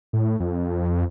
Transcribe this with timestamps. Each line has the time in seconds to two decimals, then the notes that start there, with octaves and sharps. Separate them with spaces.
0.13 A2
0.40 F2